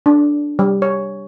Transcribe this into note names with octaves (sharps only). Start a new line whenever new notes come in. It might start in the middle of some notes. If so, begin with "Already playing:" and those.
D4
G3
C#5